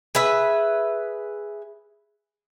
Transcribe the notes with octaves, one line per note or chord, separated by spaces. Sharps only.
G#4 B4 E5